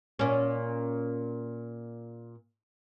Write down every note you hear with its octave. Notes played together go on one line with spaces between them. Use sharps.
A#2 C#4